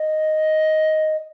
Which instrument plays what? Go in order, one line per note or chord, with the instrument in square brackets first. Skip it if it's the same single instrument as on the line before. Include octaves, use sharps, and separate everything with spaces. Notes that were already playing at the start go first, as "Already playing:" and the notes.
Already playing: [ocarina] D#5